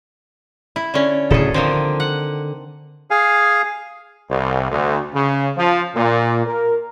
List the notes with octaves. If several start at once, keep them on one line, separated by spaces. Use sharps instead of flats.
E4
D3 C#4
D1 C#3 G#4 A4
D3 D#3 F3 C4
F#5
G#4 F5 G#5
C2
D2
C#3
F3
A#2
A#4